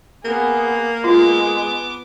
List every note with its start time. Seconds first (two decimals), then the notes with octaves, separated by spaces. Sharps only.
0.25 A#3 B3 G#4
1.04 G#3 B3 F4 D6